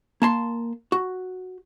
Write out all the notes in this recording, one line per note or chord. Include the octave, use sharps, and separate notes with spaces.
A#3 A5 C6
F#4